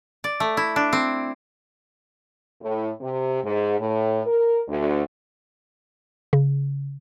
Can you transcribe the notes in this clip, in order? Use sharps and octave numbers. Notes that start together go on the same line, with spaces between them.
D5
A3
E4
D4
C4
A2
C3
G#2
A2
A#4
D2
C#3